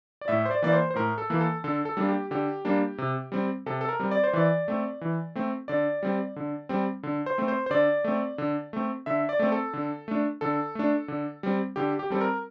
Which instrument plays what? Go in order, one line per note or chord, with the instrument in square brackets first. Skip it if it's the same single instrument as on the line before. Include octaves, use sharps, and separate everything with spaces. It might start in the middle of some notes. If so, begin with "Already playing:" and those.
[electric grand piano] D5
A2 E5
C5
D5
E3 A#3 D5
C5
C5
A2 A#4
A4
E3 A#3
A4
D3 A4
A4
G3 A#3 D4
G4
D3 G4
G3 A#3 D4
C3
G3 C4
C3 A4
A4
A#4
G3 C4
D5
C5
E3 D5
A3 C4
E3
A3 C4
D3 D5
G3 C4
D3
G3 C4
D3
C5
A3 C4
C5
C5
D3 D5
A3 C4
D3
A3 C4
D3 E5
D5
A3 C4
A4
D3
A3 D4
D3 A4
A3 D4
D3
G3 C4
D3 G4
G4
G3 C4 A4
A#4